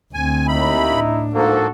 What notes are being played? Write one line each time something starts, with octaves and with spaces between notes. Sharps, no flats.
D2 C4 G#5
D#2 D#4 E4 E5 B5
A2 D4
G#2 F3 A#3 F#4 A4